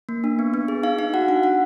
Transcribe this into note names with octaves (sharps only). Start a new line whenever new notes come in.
A#3
D4
B3
B3
G#4
D#4 F5
D#4 F5
F#4 F#5
D4 F#5
D4 F#5